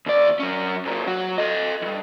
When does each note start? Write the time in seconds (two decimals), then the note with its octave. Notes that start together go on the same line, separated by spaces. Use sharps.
0.06 D#2 D5
0.39 F#3 C#4
0.85 G#2 A#3
1.07 F#3 F#4
1.38 A4 D#5
1.82 E2 G2